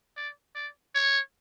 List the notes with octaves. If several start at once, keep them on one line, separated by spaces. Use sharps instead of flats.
D5
D5
C#5